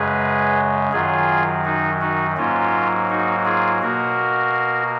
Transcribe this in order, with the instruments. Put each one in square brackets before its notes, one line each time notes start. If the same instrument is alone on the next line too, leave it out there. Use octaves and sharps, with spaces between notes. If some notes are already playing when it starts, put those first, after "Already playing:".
Already playing: [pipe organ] F#2 C#3 G#3 G#4 B4
F#2 D#3 F#3 F4 G#4
D#4 F#4
D#4 F#4
G#2 F#3 A#3 C#4 F4
D#4 F#4
F4 G#4
B2 A#3 F#4 A#4